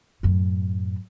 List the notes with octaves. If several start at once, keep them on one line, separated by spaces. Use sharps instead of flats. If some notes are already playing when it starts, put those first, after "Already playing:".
F#2 A2